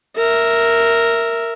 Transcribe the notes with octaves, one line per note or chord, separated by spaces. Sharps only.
A#4 E5